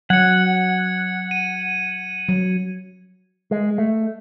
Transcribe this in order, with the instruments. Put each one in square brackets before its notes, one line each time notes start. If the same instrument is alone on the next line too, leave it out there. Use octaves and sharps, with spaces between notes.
[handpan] F#3 [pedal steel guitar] F#5 [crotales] G#6 C#7
[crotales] D#7
[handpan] F#3
[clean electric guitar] G#3
A3